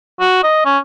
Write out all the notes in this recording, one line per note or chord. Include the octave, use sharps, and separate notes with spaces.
F#4
D#5
C#4